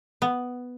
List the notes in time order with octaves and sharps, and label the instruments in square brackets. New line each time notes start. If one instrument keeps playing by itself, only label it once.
[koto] B3